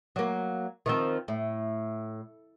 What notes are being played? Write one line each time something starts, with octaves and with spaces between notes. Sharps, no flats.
F#3 A#3
D#3 F3 C4
A2